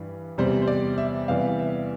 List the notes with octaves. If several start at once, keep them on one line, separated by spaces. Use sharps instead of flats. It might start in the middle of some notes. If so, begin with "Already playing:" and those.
Already playing: G2 E3 G3
E2 C3 G3 C5
C5
D5
E5
E2 C3 E3 G3 F5
E5